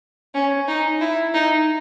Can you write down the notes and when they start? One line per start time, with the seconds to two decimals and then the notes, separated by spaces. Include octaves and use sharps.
0.34 C#4
0.68 D#4
1.01 E4
1.34 D#4